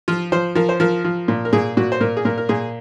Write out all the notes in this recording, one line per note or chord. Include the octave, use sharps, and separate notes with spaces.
F3 F4
F3 C5
F3 A#4
C5
F3 A#4
F3
A#2
A#4
A#2 G#4
A#2 F#4
C5
A#2 A#4
G#4
A#2 A#4
A#4
A#2 G#4